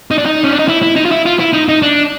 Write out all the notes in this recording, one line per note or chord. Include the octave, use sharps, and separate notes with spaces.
D#4
D4
D#4
C#4
D4
D#4
E4
E4
D#4
F4
E4
F4
E4
D#4
D#4
D4